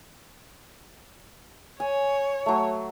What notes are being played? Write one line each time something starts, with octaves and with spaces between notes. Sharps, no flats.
C#5 G#5
F#3 A3